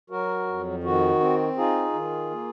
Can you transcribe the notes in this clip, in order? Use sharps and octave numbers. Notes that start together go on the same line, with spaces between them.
F#3 F#4 A#4
F2
D#3 F#4
C4
D#4 F4 G#4
D#3
A#3